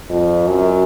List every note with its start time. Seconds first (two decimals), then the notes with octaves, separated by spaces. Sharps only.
0.10 F2
0.48 F#2